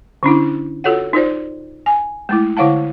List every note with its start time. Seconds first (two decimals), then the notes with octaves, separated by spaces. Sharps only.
0.23 D3 C#4 D4 E4
0.84 F4 F#4 A4 C#5 F#5
1.13 D#4 F4 C5 D5
1.86 G#5
2.29 G#3 A3 E4
2.57 D3 E4 C#5 F5 F#5 A5